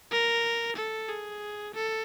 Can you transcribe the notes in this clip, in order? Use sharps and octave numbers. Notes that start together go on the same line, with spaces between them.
A#4
A4
G#4
A4